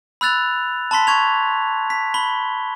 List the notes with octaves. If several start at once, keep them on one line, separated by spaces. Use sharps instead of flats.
B5 E6 F#6 A6 F7
A5 B5 C6 B6
C#6 G#6 F7
B6
B5 G7